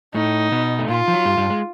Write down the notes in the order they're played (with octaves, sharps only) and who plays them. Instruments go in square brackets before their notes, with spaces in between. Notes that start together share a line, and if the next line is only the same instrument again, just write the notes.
[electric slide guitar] A2 A3 [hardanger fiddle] D#4
[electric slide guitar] B2 B3
A3
[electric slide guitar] A#2 A#3 [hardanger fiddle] F4
[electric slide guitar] F3
F#3
G2 G3
G2 G3
G#3